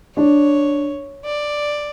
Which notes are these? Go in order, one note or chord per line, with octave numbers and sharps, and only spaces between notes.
D4 C#5
D5